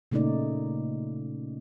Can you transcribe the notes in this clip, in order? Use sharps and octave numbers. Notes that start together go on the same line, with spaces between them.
A#2 C#3 A3 A#3 D#4 D5